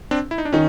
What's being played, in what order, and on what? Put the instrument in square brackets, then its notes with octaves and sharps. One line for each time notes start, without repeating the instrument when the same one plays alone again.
[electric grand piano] C4 D4
E4
D#4
D4
[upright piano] D#3 [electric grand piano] C#4 D#4